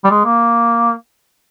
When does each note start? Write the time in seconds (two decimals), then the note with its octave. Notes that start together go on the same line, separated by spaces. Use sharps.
0.04 G3
0.10 G#3
0.25 A#3